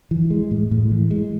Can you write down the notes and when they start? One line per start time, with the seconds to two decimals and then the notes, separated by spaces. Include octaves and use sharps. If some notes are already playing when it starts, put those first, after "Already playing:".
0.11 E3
0.30 G#3
0.51 A2
0.71 A2
0.91 E3
1.11 G#3